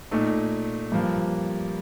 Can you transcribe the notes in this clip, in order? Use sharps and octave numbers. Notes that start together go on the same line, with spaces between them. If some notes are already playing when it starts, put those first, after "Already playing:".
A#2 A3 D#4
G2 F3 A#3